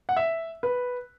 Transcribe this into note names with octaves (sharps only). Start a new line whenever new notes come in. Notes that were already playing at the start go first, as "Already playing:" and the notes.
F#5
E5
B4